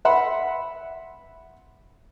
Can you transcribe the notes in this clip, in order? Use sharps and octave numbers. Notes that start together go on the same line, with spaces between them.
E5 F#5 B5 C6